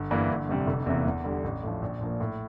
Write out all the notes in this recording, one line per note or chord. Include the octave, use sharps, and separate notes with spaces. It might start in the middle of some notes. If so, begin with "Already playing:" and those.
Already playing: G1
G2 E3 A#3 E4
G1
F2 C3 G3
F1
E2 C3 E3 A#3
E2
D3 G3
A1
A2 F3
A#1
A#2 F3 A#3
A2